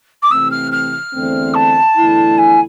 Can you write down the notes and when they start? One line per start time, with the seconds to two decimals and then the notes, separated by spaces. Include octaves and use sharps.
0.22 D6
0.30 C3 E3 A3 C4 E6
0.51 F6
0.72 F6
1.14 E2 D3 A3 C4
1.54 A5
1.96 E2 D3 A3 E4
2.38 G#5